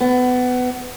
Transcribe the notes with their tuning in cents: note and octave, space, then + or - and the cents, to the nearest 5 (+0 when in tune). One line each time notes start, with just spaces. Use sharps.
B3 +20